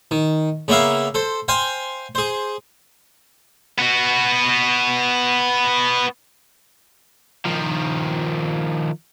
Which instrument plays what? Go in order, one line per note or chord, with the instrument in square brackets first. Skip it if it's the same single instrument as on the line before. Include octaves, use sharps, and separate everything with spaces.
[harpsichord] D#3
C#3 A#3 B3 E5 F5
A4 C5
C5 F5 G5 G#5
G#4 C5
[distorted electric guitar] B3 F#4
[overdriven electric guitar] D#3 F3